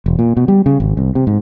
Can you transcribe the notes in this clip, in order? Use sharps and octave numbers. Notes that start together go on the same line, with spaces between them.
E1
A#2
B2
G3
C#3
G#1
C2
C3
G#2